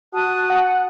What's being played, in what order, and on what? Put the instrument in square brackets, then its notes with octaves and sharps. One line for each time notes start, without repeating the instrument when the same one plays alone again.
[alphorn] F#4 [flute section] A5 D#6 F#6
[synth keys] F#5